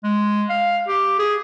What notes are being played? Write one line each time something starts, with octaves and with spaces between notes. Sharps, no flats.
G#3
F5
G4
G#4